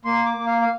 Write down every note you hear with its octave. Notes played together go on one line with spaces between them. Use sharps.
A#3 C6
D6
A#3
F5
F5